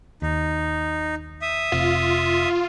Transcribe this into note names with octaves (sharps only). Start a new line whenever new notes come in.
D#2 D#4
E5 D#6
F1 C3 F4